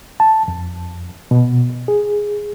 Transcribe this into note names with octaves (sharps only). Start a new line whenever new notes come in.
A5
F2
B2
G#4